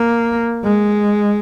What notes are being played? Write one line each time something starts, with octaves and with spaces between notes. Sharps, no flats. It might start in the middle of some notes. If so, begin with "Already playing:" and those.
Already playing: A#3
G#3